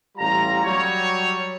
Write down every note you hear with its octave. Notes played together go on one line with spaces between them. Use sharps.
A1 G3 F4 A#5
F#3 G3 C#5